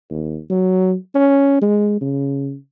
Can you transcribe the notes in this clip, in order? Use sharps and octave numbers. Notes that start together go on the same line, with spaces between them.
D#2
F#3
C#4
G#3
C#3